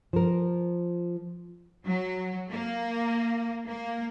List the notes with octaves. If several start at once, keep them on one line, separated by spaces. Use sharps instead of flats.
F3 A#4
F#3
A#3
A#3